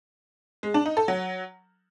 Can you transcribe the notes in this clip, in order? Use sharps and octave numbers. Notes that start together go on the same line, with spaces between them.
G#3
D4
D#4
A4
F#3